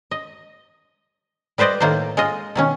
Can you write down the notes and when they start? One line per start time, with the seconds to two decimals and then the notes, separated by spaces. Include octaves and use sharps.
0.11 D#5
1.58 G3 B4 C5 D5 D#5
1.80 A2 D#3 A#3 F4 C5
2.17 G#3 F4 D#5
2.55 B2 D#3 C#4